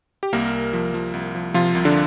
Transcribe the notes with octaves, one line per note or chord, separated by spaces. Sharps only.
G4
C2 A#3 A#4
C2
F3
F3
C2
F3
C3 F3 F4
C2
D3 D4